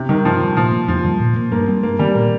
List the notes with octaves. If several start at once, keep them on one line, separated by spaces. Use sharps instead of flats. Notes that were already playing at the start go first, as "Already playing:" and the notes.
Already playing: C3
D#3 G3 C4
G2 F3
D#3 G3
A#2 F3
A#3
F2 F3
D#3 G3 A#3
A#2
A#3
G2 A#3
G3 C4
G2 A#3
D#3 G3 C4
A#2 A#3